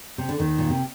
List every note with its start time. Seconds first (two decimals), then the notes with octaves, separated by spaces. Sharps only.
0.18 C3
0.29 D3
0.39 D#2 D#3
0.58 A#2
0.70 C3